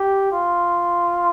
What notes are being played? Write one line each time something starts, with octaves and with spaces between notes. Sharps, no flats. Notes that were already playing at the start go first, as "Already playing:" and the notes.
Already playing: G4
F4